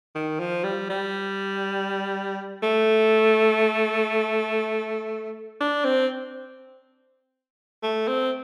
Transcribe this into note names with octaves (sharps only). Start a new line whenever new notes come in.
D#3
F3
G3
G3
A3
D4
C4
A3
C4